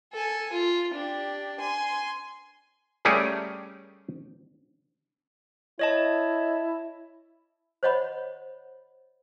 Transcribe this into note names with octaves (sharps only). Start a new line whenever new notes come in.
A4 G#5
F4
D4 G4
G#5 C6
G3 A3 C#4 G4 G#4 A#4
E4 C#5 D#5 A5
C5 C#5 D#5 F#5 B5